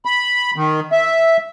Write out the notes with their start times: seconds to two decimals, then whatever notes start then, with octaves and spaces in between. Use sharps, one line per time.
0.05 B5
0.56 D#3
0.92 E5